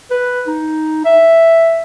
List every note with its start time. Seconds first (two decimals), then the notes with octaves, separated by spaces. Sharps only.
0.11 B4
0.47 D#4
1.05 E5